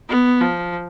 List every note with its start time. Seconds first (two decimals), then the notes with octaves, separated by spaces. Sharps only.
0.09 B3
0.41 F3